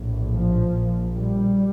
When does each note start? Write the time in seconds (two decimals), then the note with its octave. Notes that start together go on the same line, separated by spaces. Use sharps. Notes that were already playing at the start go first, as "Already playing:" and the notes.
Already playing: A#1 A2
0.33 F3
0.74 A#1 A#2
1.16 G3